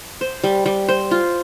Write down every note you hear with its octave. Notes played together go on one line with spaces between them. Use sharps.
C5
G3
G3
C5
F4